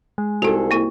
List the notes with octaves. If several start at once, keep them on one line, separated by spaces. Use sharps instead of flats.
G#3
C2 D#4 F#4 G#4 A4
A#3 E4